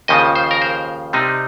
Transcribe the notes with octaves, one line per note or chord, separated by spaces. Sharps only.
D#2 C#3 F3 D#5
C5
A#4
C5
C3 G3 C4 D#4